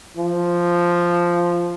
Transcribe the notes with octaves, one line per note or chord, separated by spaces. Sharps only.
F3